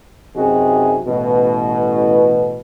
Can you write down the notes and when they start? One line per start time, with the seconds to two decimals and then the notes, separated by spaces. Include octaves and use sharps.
0.37 F#2 C3 D#4 F#4 G#4
1.07 A1 B2